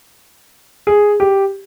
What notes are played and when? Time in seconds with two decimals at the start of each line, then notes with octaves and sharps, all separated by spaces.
0.87 G#4
1.20 G4